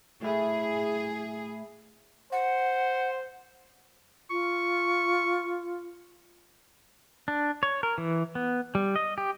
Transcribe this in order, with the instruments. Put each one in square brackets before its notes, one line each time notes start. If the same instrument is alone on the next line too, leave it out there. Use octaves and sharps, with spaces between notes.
[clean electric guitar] A2 E4 [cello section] G#4
[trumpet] C5 [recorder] F#5
[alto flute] F4 [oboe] C#6
[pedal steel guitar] D4
C#5
A#4
E3
B3
G3
D#5
G4